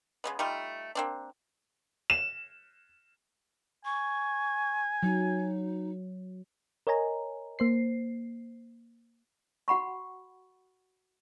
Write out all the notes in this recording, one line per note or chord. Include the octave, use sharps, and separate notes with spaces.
C#3 G#3 B3
G3 A3 D#4 F4
A#3 C4 D4
E7
G#5 C#6
F#3 D#4
A#4 C#5 D#5 G#5 A#5
A#3 C5 C7
F#4 F#5 B5 C#6